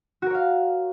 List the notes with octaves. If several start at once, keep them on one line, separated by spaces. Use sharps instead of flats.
F#4 A#4 C#5 F5